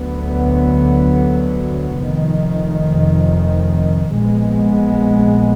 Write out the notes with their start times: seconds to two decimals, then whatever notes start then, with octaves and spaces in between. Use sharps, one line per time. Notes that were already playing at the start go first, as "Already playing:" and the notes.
Already playing: D2 D3 F#3 B3
2.01 F1 F2 D#3
4.18 A#1 A#2 G#3 B3